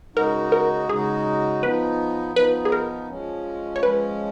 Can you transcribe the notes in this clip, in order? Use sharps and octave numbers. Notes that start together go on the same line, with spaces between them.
C#3 G#3 D#4 F#4 A#4
A#4
C#3 G#3 D#4 F#4 G#4
F3 B3 D#4 B4
F3 B3 D#4 B4
G#4
A#4
F3 G#3 C#4
C#5
F3 G#3 C#4 B4